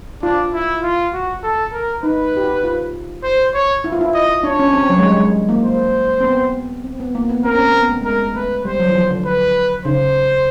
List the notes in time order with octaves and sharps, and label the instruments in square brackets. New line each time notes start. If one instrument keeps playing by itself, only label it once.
[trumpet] D4 [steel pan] F4
[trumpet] E4
F4
F#4
A4
A#4
[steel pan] D#4 [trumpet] B4
[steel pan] G4
F#4
F4
[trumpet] C5
C#5
[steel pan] E4
F4
E4
[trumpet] D#5
[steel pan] D4 [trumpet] C#5
[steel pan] C#4
C4
F#3
G#3
G3
G#3
A#3
[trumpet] C5
[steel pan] C4
B3
C4
B3
A#3
B3
[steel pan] C4 [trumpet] A#4
[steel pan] C#4
C4
B3
A3
G#3
[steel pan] A3 [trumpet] A#4
[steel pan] A3 [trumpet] B4
[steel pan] G3 [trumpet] C5
[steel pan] F#3
E3
F3
D3
[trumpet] B4
[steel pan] C#3 [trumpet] C5